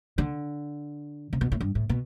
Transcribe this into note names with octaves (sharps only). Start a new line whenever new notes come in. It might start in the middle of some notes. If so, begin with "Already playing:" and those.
D3
C3
B2
A2
G2
A2
B2